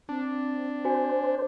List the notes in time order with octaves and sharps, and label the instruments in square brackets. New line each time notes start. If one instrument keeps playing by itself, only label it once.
[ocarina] C4 [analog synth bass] D4
[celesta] F#4 G#5 [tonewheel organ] C5